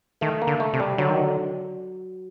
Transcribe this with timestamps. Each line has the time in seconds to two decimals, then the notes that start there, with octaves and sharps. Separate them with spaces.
0.21 D#3 A3
0.42 A#3
0.47 D3
0.60 A3
0.73 C3
0.80 G3
0.98 D3 F#3
1.09 D#3
1.21 D3